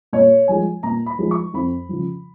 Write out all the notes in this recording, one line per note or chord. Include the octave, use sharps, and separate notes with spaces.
A#2 C#5
F3 G#3 G#5
A#2 A#5
B5
F3 G#3
C#6
F2 B5
C#3 F3